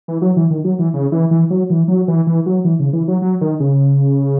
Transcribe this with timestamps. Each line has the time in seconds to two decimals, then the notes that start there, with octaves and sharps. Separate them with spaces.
0.08 E3
0.22 F#3
0.37 E3
0.50 D#3
0.64 F#3
0.79 E3
0.94 C#3
1.12 E3
1.31 E3
1.50 F#3
1.70 E3
1.88 F#3
2.08 E3
2.27 E3
2.46 F#3
2.64 E3
2.79 C#3
2.93 E3
3.08 F#3
3.22 F#3
3.41 D#3
3.60 C#3